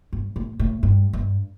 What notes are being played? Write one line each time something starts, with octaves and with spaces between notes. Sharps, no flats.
G2
A2
A2
G2
G2